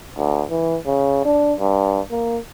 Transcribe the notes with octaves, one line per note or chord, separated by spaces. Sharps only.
D2
E3
C#3
D4
G2
A#3